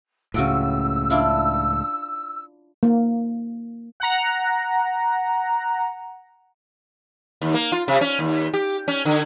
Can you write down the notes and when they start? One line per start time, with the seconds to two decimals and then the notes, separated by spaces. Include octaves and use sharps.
0.34 C#2 A2 C#3 F#4 G5 E6
1.10 D4 E4 F4
2.83 A#3
4.00 F#5 A#5
7.41 D#2
7.54 A#3
7.72 F4
7.88 C3
8.01 C#4
8.19 D#2
8.54 G4
8.88 C#4
9.05 D3